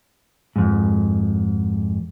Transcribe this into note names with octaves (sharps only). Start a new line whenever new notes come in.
F2 G#2